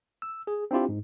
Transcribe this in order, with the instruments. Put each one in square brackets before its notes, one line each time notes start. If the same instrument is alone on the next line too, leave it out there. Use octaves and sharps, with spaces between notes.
[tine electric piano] E6
G#4
C4 D4 E4 F4 G4
G#2